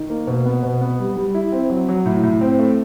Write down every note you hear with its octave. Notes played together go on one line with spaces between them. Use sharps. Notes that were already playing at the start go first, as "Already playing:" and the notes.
Already playing: D#3
A#3
B2
B3
B2
B3
G3
G3
E4
C4
F#3
F#3
A2
A2
C4
A3